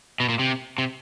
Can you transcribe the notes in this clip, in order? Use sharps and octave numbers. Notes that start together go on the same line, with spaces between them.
B2
A#2
C3
C3